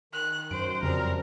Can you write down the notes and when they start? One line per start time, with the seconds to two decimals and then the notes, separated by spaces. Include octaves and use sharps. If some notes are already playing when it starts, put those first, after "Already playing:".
0.13 D#3 F#6
0.51 F#2 C5 D7
0.83 F2 C#3 F3 G3 C4 A#4